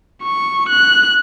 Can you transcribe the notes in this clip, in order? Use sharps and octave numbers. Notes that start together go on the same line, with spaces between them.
C#6
F#6